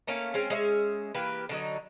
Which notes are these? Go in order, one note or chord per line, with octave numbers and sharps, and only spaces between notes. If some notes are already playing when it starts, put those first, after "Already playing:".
A3 A#3 C#4 F5
G#3 C4 C#4
G#3 C#4 E5
E3 A#3 G4 B4
D3 F#3 D#4